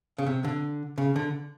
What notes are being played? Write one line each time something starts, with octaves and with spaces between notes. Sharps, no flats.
C#3
C3
D3
C#3
D3